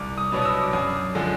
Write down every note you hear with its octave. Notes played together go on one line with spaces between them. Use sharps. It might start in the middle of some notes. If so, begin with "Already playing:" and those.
Already playing: C2 D6
D#6
B2 F#3 B3 D4
D#6
E6
D6
F#2 D#6
D3 F3 G#3